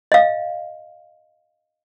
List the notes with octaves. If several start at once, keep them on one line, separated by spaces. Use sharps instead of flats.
D#5 F5